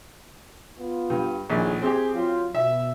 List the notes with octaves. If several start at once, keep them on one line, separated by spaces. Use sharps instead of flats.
B3 F4
G2
A#1 A2 D#3 G#4
C4 G4 G#4
F#3 F4
B2 E5